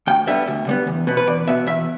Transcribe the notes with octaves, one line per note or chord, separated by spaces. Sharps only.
D2 G5
D3 G3 B3 E5
D2
D3 G3 B3
E2
B2 B3
B4
E2 D5
B2 B3 E5
E2 E5